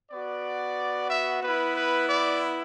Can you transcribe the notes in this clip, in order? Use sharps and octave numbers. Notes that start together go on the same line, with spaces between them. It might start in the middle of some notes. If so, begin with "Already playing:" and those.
B3 F#4 D5
E5
B3 E4 B4
B4
D5